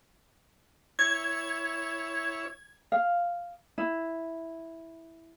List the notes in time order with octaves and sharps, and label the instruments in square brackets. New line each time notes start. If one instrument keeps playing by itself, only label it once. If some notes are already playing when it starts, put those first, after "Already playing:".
[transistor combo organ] E4 C#5 [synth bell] G#6
[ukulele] F5
E4